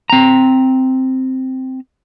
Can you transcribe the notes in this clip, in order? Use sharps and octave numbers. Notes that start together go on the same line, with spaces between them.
C4 A#5